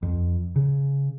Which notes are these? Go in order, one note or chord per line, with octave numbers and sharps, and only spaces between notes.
F2
C#3